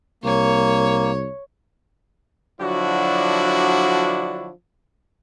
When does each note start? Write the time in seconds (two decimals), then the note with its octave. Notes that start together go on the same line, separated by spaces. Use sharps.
0.24 C2 A#3 C#5
2.60 D3 F3 F#3 D4 E4 F#4